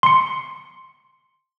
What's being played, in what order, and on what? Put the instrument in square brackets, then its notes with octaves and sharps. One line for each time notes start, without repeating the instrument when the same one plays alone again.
[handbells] C6 C#7